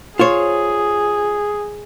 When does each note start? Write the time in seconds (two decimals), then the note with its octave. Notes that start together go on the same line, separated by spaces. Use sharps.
0.19 F4 G#4 C5 C#5